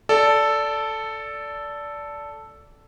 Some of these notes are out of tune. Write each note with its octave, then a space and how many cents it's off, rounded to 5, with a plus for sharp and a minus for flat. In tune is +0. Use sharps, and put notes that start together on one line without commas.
A4 +0 D5 -15